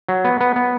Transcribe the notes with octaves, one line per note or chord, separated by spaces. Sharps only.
F#3
B3
B3
B3